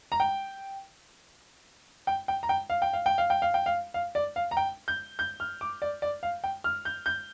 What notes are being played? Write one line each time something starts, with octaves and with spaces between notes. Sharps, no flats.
A#5
G5
G5
G5
A#5
G5
F5
G5
F5
G5
F5
G5
F5
G5
F5
F5
D5
F5
A#5
G5
G6
G6
F6
D6
D5
D5
F5
G5
F6
G6
G6